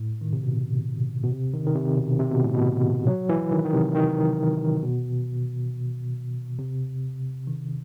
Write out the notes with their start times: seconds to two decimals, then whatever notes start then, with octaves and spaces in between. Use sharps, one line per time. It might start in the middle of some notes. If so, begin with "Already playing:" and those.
Already playing: A2
0.21 D#3
0.33 C3
0.43 B2
1.23 B2
1.31 C3
1.54 D#3
1.66 D#3
1.75 C3
1.97 B2
2.20 C3
2.31 B2
2.44 A2
2.55 B2
3.07 F#3
3.29 E3
3.52 D#3
3.65 D#3
3.73 C3
3.95 D#3
4.83 B2
6.59 C3
7.47 D#3